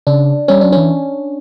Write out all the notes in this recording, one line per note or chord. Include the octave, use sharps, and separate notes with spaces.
C#3 D4
G3 C#4
F#3 D4
C#4
E3